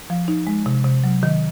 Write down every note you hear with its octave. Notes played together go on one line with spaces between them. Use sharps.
F3
D#4
G#3
C3
C3
F#3
D#3